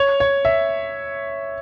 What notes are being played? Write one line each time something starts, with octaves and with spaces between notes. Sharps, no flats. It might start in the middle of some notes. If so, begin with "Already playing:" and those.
Already playing: C#5
C#5
E5